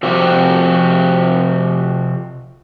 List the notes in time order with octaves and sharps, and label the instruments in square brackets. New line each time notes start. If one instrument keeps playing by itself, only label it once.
[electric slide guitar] C3 F3 C4 F#4 G4